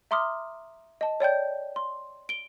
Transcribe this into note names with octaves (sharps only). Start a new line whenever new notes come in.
E5 A#5 C6 D6 D#6 F6
D#5 A5
C#5 D5 G5 G6
C6
D7 G7